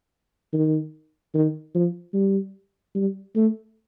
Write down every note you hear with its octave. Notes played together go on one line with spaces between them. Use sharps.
D#3
D#3
F3
G3
G3
A3